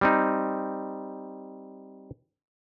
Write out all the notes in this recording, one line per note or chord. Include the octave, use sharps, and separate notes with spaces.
G3 C4 D#4